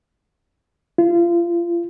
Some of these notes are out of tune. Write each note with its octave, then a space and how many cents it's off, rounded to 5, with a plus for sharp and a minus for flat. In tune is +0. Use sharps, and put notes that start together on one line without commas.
F4 -30